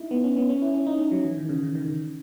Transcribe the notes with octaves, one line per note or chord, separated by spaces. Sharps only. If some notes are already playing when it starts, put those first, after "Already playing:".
Already playing: D#4 E4
B3
C#4
B3
C#4
E4
C#4
D#4
C#4
F#3
E3
D#3
C#3
D#3
D#3
C#3